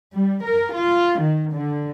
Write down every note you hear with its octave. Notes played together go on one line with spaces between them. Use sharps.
G3
A#4
F4
D#3
D3